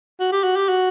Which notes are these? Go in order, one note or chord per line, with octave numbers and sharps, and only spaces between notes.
F#4
G4
F#4
G4
F#4